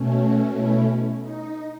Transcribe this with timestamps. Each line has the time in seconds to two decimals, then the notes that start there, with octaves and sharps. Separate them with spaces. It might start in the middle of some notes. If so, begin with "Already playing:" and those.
Already playing: B2 A3 C#4
0.25 F#4
0.57 E4
1.21 D#4